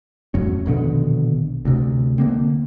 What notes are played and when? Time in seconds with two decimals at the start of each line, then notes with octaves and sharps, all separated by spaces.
0.34 A1 F2 F#3 C#4
0.66 A#1 B2 D3 D#3
1.65 D2 C3
2.18 D3 A#3 C4